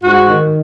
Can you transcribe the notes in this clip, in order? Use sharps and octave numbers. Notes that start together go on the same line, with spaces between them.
G#2 F#4
D#3